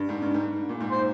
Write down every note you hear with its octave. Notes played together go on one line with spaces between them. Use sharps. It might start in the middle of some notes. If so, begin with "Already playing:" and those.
Already playing: G2
G#2
G2
G#2
A#2
G#2
C5